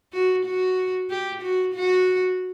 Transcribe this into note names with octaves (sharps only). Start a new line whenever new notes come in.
F#4
F#4
G4
F#4
F#4